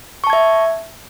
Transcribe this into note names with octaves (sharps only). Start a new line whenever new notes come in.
E5 A5 C#6 G#6